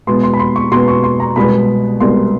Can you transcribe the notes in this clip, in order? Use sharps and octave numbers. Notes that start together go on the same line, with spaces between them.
B2 G#3 B3 C6
C6
B5
C6
C#6
B2 G#3 B3 C6
C#6
C6
A#5
C2 B2 G#3 B3 B5
C2 B2 G#3 B3 C6